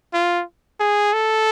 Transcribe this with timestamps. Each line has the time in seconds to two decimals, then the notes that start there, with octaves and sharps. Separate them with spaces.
0.13 F4
0.80 G#4
1.13 A4